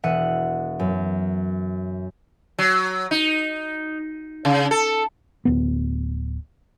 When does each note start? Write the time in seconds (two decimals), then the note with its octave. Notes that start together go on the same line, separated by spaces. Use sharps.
0.03 E1 E5 F#5 D#7
0.79 F#2
2.59 F#3
3.11 D#4
4.45 C#3
4.71 A4
5.45 D1 B3